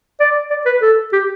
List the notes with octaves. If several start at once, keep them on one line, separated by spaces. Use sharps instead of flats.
D5
D5
B4
A4
G4